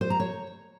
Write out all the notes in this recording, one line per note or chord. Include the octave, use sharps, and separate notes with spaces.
C5
A#5
C#5